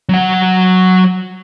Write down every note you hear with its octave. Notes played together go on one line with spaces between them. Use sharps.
F#3 F#5